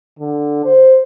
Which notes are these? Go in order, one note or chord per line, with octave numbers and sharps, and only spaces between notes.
D3
C5